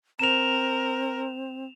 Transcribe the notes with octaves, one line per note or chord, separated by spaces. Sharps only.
C4 A#4 E7 F7